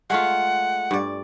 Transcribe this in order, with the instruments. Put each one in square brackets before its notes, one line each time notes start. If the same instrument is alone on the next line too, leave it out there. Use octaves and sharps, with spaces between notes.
[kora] G#3 A3 F4 [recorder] F#5
[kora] G2 D5